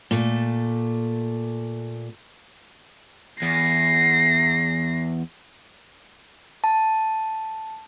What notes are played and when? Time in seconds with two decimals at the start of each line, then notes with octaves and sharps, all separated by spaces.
0.11 A#2 A3 A4
3.42 E2 A#6 C7
6.64 A5